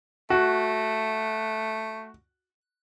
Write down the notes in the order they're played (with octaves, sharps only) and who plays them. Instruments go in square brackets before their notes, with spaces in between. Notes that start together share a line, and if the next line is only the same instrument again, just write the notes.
[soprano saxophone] A3 [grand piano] F#4